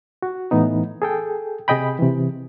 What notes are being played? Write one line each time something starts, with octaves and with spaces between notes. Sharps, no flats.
F#4
A2 E3 B3 D#4
G#4 A4 G5
C3 G#4 D#5 G5 B5
C3 E3